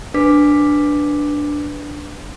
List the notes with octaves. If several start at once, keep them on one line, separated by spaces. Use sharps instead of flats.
D4 B4 D6 B6